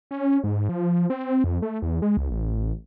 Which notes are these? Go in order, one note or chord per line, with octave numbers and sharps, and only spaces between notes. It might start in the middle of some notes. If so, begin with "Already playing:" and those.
C#4
G#2
F3
C4
F2
A3
E2
G#3
C#2
A1